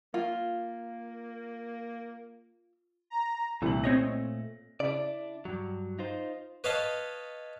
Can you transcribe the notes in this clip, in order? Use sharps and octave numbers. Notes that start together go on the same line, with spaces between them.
A#3 F4
A#5
C2 A#2 A3 F#7
C4 C#5 D#5 A#6
C#3 D4 E4 D5
G2 F#3
D#4 F4 C5
B4 C#5 D#5 F5 A5 B5